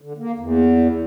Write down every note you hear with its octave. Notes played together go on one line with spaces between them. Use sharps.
D3
A#3
E2